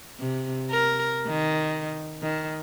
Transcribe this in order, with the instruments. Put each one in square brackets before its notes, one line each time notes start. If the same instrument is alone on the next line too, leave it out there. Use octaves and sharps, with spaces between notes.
[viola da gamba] C3
A#4
D#3
D#3